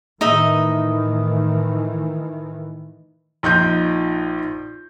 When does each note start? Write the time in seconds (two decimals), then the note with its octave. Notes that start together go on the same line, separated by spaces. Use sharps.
0.21 A2 D#3 E3 D#4 D#5 E5
3.43 A#1 D#4 F4 G6